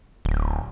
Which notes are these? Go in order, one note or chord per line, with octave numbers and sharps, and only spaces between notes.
D1